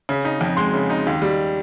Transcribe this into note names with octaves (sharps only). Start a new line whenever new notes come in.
C#3
D#4
F2
G#3 C6
C#3
D#4
D#2
G3